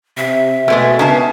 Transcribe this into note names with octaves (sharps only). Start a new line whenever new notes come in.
C3 E5
B2 G#3 A3 C4 D#5
C#3 B3 D4 D#4 A#4 A5